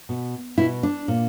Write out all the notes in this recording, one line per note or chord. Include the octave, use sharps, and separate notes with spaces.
B2
B2 E4
D4
A#2